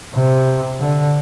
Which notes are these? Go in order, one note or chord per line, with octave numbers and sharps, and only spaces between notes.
C3
D3